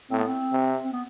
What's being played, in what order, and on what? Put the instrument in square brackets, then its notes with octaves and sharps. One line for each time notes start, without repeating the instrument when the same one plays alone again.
[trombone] A2 [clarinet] C4
[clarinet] B3
C4
[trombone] C3
[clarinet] C4
B3